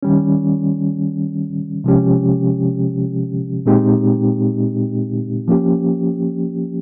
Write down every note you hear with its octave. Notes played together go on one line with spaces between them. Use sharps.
D#3 G3 C#4
C3 F3 G#3 C#4 G4
A#2 G#3 C4 D#4 G4
F3 A#3 C#4 G4